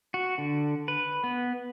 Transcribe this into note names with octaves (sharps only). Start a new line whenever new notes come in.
F#4
D3
B4
B3